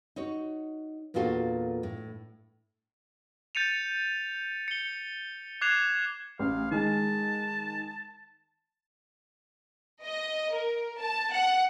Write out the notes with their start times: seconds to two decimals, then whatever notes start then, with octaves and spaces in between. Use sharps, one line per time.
0.16 D#4 F#4 C#5
1.14 E2 A#2 D4 F4 F#4 A4
1.83 A2
3.55 G6 A6 C#7 D#7 F7
4.68 C#7 G7
5.61 D6 F#6 G#6 C7 E7 F7
6.39 A1 F5
6.71 D#3 G#3 A5
10.04 D#5
10.55 A#4
11.00 A5
11.33 F#5